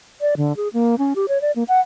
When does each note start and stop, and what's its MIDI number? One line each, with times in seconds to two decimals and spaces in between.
0.21 0.35 74
0.37 0.55 50
0.57 0.68 68
0.73 0.95 58
0.98 1.13 61
1.16 1.26 67
1.28 1.41 73
1.41 1.52 74
1.56 1.64 58
1.68 1.80 78